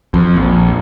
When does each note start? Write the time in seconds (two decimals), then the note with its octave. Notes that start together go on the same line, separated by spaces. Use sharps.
0.14 F2
0.36 A#1